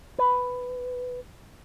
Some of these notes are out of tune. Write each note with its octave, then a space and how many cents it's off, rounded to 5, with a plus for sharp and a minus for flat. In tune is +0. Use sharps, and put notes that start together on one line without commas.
B4 +10